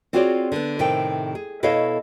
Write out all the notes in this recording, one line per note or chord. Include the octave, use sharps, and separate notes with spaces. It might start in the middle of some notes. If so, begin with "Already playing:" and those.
C4 F4 F#4 G#4 C#5 D5
D3 B3
A2 C3 D#3 A4 G5
G#4
B2 E4 A4 C#5 D#5 F5